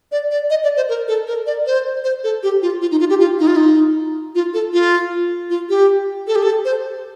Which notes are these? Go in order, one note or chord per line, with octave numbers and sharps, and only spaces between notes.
D5
D5
D#5
D5
C5
A#4
A4
A#4
D5
C5
C5
A4
G4
F4
F4
D#4
F4
G4
F4
D#4
F4
D#4
F4
A4
F4
F4
G4
A4
G4
A4
C5